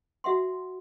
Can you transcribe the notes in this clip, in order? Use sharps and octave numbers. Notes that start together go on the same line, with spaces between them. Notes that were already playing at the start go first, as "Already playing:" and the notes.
F#4 E5 F#5 C6